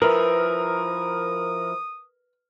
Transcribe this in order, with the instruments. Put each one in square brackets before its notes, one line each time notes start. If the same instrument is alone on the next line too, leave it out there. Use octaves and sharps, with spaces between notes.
[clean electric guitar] F3 E4 [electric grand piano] A#4 [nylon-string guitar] B4 [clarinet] D#6